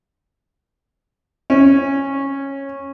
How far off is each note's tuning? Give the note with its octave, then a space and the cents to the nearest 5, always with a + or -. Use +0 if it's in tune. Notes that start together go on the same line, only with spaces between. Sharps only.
C#4 -15